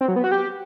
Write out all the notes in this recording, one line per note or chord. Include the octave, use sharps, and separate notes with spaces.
C4
F#3
B3
F#4
G4